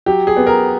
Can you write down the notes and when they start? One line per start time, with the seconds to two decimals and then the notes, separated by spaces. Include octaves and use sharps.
0.06 F#3 G4
0.27 G#4
0.37 B3
0.46 A#4